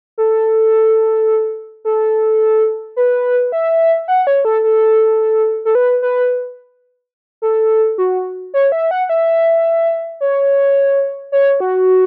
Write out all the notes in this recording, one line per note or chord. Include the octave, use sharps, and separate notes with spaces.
A4
A4
B4
E5
F#5
C#5
A4
A4
A4
B4
B4
A4
F#4
C#5
E5
F#5
E5
C#5
C#5
F#4